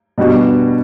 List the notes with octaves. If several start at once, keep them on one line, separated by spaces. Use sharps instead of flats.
B2 G3 B3 D4 F#4